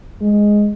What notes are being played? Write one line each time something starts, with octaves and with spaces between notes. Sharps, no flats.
G#3